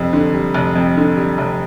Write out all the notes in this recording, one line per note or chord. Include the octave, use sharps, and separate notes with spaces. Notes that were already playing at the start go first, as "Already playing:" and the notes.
Already playing: F1 F2 G3
D3
G3
F1
F2
D3
G3
F1